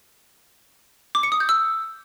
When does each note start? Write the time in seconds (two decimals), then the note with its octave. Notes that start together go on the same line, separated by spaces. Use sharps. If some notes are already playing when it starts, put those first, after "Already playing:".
1.15 D6
1.23 C#7
1.32 D#6
1.40 G6
1.49 E6